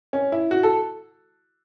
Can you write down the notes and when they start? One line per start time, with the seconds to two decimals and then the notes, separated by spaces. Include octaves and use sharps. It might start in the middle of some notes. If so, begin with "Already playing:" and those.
0.13 C#4
0.32 E4
0.51 F#4
0.63 A4